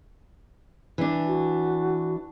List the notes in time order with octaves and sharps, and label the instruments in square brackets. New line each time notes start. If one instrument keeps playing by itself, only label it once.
[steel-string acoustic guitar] E3 D4
[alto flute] F#4